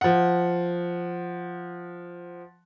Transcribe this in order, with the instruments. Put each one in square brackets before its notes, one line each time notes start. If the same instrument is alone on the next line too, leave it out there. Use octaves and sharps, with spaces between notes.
[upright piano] F3 F#5